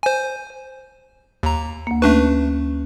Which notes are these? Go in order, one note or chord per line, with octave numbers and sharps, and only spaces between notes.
C5 G#5
D#2 A#5
D2 A#3
A3 C#4 D4 B4